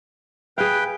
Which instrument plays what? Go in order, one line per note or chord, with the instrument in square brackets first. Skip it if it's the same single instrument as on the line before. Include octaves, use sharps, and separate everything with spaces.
[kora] G#4 F5 [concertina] B4 G5